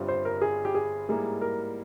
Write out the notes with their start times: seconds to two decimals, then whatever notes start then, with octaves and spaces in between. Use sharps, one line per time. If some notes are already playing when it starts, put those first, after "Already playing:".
Already playing: G1 G2 G3 C4 F4
0.08 C5
0.25 A#4
0.42 G#4
0.65 G4
0.75 G#4
1.09 G#2 G3 A#3 E4 G#4
1.41 A#4